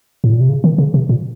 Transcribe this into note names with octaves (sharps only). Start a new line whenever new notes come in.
A2
A#2
C3
C#3
D#3
C#3
C3
A#2